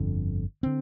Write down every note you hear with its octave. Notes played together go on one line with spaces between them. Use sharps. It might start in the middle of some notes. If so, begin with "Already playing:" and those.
Already playing: G1 F2 D3
D3 C4